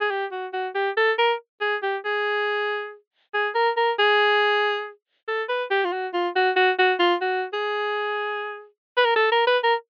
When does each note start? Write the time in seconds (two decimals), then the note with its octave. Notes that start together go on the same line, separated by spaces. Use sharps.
0.01 G#4
0.11 G4
0.32 F#4
0.53 F#4
0.75 G4
0.97 A4
1.18 A#4
1.61 G#4
1.82 G4
2.05 G#4
3.34 G#4
3.55 A#4
3.77 A#4
3.99 G#4
5.28 A4
5.49 B4
5.70 G4
5.85 F4
5.92 F#4
6.14 F4
6.36 F#4
6.56 F#4
6.79 F#4
6.99 F4
7.21 F#4
7.53 G#4
8.97 B4
9.05 A#4
9.16 A4
9.32 A#4
9.47 B4
9.64 A#4